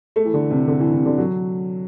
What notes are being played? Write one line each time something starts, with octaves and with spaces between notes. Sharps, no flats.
A3
E3
D3
C3
D3
E3
C3
D3
F#3